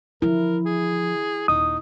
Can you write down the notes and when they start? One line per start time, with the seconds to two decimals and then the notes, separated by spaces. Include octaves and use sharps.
0.22 D3 F3 E4 A#4
0.66 G#4
1.48 D#1 D#4 D#6